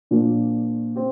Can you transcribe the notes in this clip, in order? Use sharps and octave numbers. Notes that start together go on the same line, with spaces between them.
A#2 F3 A#3 D4
C4 G4